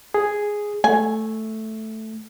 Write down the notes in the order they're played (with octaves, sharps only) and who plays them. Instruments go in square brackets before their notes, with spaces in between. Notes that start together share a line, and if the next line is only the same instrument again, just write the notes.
[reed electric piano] G#4
[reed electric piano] A3 [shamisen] G#5